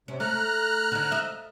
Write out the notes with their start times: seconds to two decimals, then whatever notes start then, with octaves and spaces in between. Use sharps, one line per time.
0.08 C3 C#4
0.20 A3 A#5 F6 F#6
0.92 D3 D#4
1.11 D#5 E5